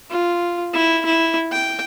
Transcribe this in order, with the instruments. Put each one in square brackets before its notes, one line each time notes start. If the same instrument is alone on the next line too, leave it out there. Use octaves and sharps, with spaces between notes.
[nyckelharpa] F4
E4
E4
G5